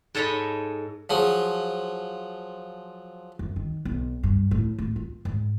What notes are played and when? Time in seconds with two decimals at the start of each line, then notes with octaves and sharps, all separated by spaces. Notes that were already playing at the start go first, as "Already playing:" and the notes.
0.15 G#2 A4 C#5 D#5 A#5 B5
1.10 F3 F#3 G#4
3.39 F#2
3.56 D#3
3.85 B1
4.23 G2
4.51 A2
4.78 A2
4.96 F4
5.25 G#2